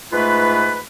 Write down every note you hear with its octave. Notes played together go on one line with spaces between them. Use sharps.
G#2 A3 F4 B4